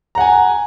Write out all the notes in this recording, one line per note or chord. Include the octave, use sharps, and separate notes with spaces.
F#5 G#5 A#5